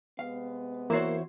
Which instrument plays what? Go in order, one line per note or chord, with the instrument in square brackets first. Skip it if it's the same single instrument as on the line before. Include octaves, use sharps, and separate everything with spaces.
[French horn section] C3 G#3 B3 [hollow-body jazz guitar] F5
[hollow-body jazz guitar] E2 F#4 [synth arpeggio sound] A#3 C7 [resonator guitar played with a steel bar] E4 C5 C#5